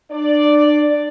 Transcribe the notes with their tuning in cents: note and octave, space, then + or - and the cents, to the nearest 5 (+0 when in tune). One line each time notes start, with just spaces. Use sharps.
D4 +35 D5 +0